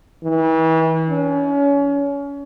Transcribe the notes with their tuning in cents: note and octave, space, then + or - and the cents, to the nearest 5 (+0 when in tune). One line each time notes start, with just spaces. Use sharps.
E3 -35
C#4 +30